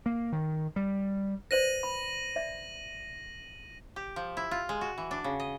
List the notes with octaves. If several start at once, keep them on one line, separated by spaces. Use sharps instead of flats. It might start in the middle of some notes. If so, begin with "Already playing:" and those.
A#3
D#3
G3
B4 C5 D5 A#6 D#7 F#7
B5
D5 E5
G4
F3
E4
F4
G#3
F#4
E3
D4
C#3
D#5